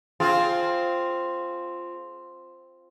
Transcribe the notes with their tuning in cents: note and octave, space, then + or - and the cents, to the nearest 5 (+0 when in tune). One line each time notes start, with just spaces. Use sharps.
C4 +0 F4 +0 G#4 +35